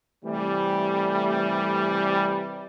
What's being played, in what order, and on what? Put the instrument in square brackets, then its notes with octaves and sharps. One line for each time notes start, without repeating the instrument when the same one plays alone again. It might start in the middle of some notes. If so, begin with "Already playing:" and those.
[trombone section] C3 E3 G3 [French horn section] A3